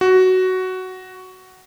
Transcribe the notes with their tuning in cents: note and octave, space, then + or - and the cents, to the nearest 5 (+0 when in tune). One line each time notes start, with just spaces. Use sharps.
F#4 +10